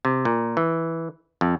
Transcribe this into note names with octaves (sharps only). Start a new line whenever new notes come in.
C3
A#2
E3
F2